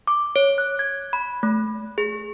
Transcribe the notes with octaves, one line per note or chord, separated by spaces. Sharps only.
D6
C#5
F#6
G#6
B5
A3
G#4